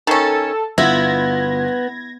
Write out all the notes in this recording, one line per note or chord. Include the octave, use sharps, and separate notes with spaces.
D#3 C#4 A4 A5
G1 B3 E4 F4 F#5 G#6 A#6